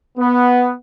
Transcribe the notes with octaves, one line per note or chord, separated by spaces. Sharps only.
B3